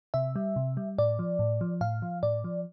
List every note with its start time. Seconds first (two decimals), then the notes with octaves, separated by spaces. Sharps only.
0.14 C3 E5
0.36 G3
0.56 C3
0.77 G3
0.98 A2 D5
1.19 F3
1.39 A2
1.61 F3
1.81 A2 F5
2.02 F3
2.23 A2 D5
2.44 F3